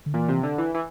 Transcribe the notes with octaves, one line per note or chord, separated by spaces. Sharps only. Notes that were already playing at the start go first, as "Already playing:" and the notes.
D3
A#2 E3
C3
D3
E3
E3